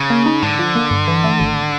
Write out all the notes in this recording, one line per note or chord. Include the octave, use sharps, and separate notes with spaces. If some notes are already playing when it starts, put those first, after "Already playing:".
Already playing: C#3
A#3
D#4
G#2 D3
F3
A#3
G2
E3
A3
G#1